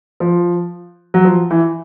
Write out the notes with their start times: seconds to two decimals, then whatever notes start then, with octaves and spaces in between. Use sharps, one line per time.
0.20 F3
1.14 F#3
1.25 F3
1.51 E3